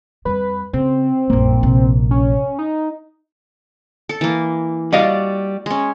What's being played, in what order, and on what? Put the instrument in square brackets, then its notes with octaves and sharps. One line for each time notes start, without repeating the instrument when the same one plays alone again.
[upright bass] F2 G3 [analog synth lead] B4
[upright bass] C#3 [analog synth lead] C4
[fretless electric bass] A#1 A#3 [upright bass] F#2 G3
[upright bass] G#2 C3
[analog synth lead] C#4
D#4
[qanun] A4
E3 A#3
[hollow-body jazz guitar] G3 D#5 F5 [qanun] F#4 D5
[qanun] G#3 C#4